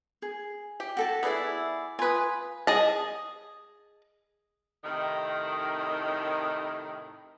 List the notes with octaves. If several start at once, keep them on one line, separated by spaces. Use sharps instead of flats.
G#4
G4
F#4 A4 A5
B3 E4 G#4 D5 E5
F4 B4 G#5 D#6
G#4 D#5 A5
A2 C3 D#3